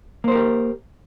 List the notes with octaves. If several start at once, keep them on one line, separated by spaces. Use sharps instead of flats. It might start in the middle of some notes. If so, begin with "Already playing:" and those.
A#3 G4 A#4 C5